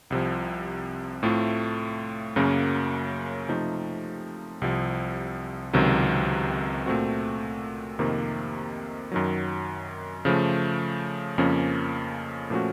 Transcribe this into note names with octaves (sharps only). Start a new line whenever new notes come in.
C2 C3 F3
A2 A3 C4 F4
F#2 C#3 F#3 A#3 C#4
C3 F3 A3 D#4
C2 C3 F3
C#2 C3 D#3 F#3
A#2 A3 C4 F#4
F2 C3 D#3 A#3
F#2 D#3 F#3
C#3 F3 A3
F2 C#3 F3 A#3 C#4
A#2 F3 A3 C#4 F#4